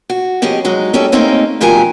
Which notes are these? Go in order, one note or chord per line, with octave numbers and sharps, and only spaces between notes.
F#4
F2 C#4 G4 G#4 D#5
F#3 G#3 D#4
G3 C#4 D#4 G4 A4
A3 A#3 C4 C#4 D#4 G4
D2 B2 F3 G4 A#4 G#5